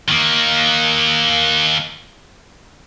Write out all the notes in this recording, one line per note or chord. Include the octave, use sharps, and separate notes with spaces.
D#3 A#3